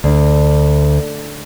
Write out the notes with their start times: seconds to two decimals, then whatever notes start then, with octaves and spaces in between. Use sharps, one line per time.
0.04 D2